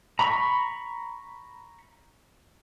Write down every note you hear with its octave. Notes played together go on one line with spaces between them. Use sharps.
A#5 B5 C#6